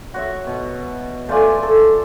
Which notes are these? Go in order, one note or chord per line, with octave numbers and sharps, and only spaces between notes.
F#4 C#5 E5
B2
A3 F4 D5 G#5
A4